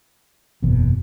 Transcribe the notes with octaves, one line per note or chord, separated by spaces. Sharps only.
F#1 E2 B2